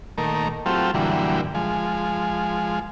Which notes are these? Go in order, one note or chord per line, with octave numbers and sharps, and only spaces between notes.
A#2 D#3 A3 A#4
F#3 A3 C4 F4 G4
F#2 A#2 D3 E3 G3
F3 G#3